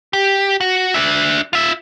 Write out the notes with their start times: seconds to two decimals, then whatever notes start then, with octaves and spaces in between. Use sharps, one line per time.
0.13 G4
0.61 F#4
0.94 D4 E5
1.53 F4 E5